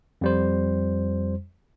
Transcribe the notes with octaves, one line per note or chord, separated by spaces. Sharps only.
F2 G3 C5